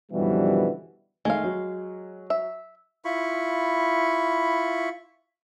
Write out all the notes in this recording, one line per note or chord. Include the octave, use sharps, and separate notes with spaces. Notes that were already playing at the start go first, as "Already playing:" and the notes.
F#2 B2 D3 E3 F3 G3
D#3 G#3 A3 F5
F#3
E5
E4 F4 B5 C#6